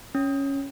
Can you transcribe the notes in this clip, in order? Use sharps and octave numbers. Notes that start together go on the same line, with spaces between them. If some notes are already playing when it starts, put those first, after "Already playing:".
C#4